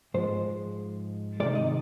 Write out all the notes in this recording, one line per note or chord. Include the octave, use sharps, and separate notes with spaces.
G#2 F3 G#3 C5
C3 D#3 G#3 D5
D#5